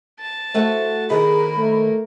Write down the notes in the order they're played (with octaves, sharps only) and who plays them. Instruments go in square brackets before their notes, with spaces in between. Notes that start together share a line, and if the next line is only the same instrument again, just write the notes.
[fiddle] A5
[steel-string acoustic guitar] A3 F#4 F#5 [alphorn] C5
[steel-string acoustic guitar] D#3 C5 [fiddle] A#3 A#4 [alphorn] G#4 [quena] B5
[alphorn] A3